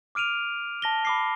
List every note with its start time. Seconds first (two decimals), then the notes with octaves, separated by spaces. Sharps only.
0.15 D6 F6 D7 D#7 F7
0.82 A5 A#6 G7
1.05 B5 D6 C7